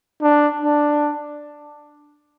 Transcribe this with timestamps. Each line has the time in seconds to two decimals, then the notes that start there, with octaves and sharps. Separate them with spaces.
0.22 D4
0.61 D4